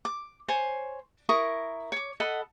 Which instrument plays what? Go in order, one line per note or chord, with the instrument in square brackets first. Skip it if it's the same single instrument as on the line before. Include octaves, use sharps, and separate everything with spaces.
[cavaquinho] D6
C5 C#5 G#5
E4 A#4 C#6 D#6
C#5 D6
A4 D#5 F#5 B5